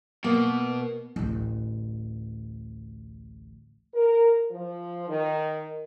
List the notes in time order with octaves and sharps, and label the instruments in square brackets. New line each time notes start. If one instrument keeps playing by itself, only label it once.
[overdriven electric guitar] B2 [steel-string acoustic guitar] A#3
[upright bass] A1 D2
[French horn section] A#4
F3
D#3